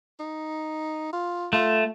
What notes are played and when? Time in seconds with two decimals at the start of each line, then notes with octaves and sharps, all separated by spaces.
0.20 D#4
1.13 F4
1.53 A3 F4